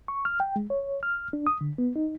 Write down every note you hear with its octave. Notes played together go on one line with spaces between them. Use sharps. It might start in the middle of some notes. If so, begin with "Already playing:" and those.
C#6
F6
G5
G#3
C#5
F6
D4
D#6
D3
B3
D#4